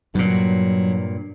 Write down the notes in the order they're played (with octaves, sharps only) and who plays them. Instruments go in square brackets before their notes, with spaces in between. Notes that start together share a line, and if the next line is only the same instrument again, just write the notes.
[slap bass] G2 A#2 [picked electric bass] F#3